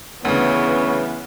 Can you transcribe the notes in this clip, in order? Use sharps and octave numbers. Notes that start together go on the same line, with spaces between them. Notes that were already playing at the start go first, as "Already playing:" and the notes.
D2 C#3 E3 B3 C#5